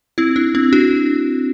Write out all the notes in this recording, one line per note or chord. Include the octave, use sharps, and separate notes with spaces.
C4 E4
D4
C4
D4 F#4